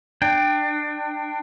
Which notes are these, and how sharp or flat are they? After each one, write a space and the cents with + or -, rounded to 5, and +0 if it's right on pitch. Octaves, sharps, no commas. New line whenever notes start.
D4 +25 G5 +0